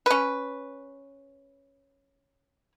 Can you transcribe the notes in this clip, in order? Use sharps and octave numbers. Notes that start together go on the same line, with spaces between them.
C#4 B4